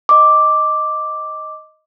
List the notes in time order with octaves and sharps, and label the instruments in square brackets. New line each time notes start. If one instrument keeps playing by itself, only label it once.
[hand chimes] D#5 D6